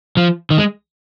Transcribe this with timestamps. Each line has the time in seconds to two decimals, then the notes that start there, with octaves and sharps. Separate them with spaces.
0.17 F3
0.50 D#3
0.58 G#3